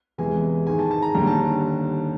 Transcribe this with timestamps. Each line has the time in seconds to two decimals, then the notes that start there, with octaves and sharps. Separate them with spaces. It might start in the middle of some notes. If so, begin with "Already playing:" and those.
0.18 E2 C3 E3 G#3 G#5
0.66 G#2 D#3 G#3 G#5
0.79 A5
0.91 A5
1.02 A#5
1.14 D#2 D3 G3 A#5
1.27 A5